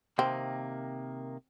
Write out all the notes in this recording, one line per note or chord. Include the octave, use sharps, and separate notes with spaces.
C3 D#3 A#3 C4